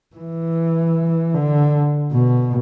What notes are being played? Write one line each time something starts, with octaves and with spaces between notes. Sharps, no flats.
E3
D3
B2